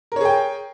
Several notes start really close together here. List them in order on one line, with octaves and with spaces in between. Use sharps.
A#4 C#5 G#4 G5